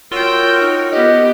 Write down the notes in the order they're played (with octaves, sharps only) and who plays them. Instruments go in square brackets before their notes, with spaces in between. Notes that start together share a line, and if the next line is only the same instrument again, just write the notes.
[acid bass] F4 [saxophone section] F#4 A#4 C#5 [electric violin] G5 E6
[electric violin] D#4
[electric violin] B3 G4 [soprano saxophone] D#5